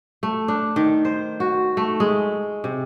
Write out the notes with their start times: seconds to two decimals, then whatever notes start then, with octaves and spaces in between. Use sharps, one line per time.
0.23 A3
0.48 D4
0.76 D#3
1.05 C5
1.40 F#4
1.77 A3
2.00 G#3
2.64 C3